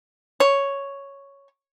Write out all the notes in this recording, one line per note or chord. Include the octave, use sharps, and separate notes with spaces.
C#5